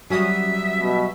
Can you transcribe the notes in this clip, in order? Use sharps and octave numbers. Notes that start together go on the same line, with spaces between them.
F#3 G3 C#4 F#4 E5 D#6
B2